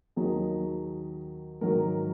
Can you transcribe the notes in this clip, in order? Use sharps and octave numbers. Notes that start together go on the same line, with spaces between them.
D#2 D#3 F#3 G#4
G#2 D#3 F#3 A#4